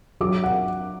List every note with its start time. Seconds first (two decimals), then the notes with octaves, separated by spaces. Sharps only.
0.21 F#3 D6
0.44 F#5